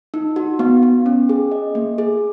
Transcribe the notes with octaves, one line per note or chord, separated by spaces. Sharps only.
D#4
F#4
B3
B3
C#4
G#4
D#5
A#3
G#4